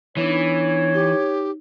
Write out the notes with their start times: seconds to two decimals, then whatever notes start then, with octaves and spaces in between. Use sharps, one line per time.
0.17 E3 B3 D4 D#4 C#5
0.94 D#4 G4